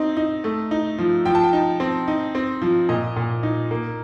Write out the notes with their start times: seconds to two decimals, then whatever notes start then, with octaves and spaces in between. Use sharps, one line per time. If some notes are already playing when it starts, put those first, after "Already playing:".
Already playing: C4 D#4
0.17 D#4
0.44 A3
0.71 D#4
0.98 F3
1.25 F3 G5
1.35 A5
1.44 G5
1.53 D#4
1.80 C4
2.08 D#4
2.35 C4
2.62 F3
2.89 A#2 D#5
3.16 A#2
3.43 D#4
3.71 A#3